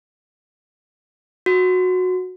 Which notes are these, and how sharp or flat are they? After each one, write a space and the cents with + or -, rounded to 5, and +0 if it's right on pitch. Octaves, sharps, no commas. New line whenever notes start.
F#4 -10